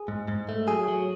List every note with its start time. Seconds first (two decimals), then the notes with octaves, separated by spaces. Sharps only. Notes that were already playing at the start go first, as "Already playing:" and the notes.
Already playing: G#4
0.08 G#2
0.28 G#2
0.49 A3
0.68 F#3 G#4
0.88 F#3